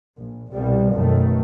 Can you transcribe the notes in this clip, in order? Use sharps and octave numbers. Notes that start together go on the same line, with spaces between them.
A#1
C2 B2 G3
F#2 B2 D#3 A3